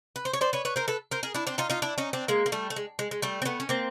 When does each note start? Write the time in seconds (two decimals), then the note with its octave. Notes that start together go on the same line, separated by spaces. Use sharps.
0.16 B4
0.25 C5
0.33 C#5
0.41 C5 D5
0.53 B4 C#5
0.65 B4 C#5
0.76 A#4 C5
0.88 A4 B4
1.11 A#4 C5
1.23 G#4 A#4
1.35 D4 E4
1.47 C4 D4
1.58 D#4 F4
1.70 D#4 F4
1.82 D4 E4
1.98 C#4 D#4
2.13 C4 D4
2.28 G#3 A#3
2.46 A#3
2.52 G3 A3
2.70 A3
2.76 G#3
2.99 G#3
3.11 G#3
3.22 G3 A3
3.42 C4
3.45 A3 B3
3.60 C#4
3.69 A#3 C4